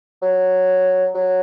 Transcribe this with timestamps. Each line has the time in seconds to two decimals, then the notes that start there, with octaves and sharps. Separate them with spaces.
0.22 F#3
1.15 F#3